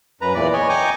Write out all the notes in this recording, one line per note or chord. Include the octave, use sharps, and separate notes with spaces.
F#2 B4 A#5
E2 A#2 E3 D5
C#5 D#5 G#5
D#5 G5 G#5 A#5 C#6 D6